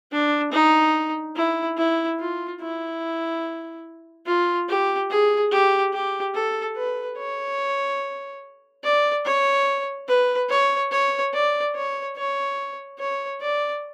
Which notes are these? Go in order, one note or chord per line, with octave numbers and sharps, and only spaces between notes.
D4
D#4
E4
E4
F4
E4
F4
G4
G#4
G4
G4
A4
B4
C#5
D5
C#5
B4
C#5
C#5
D5
C#5
C#5
C#5
D5